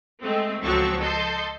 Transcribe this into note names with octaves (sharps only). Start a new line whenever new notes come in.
G#3 A3 C4
C#2 F3 F#3 C4 A4 C#6
A4 D#5 C6 G6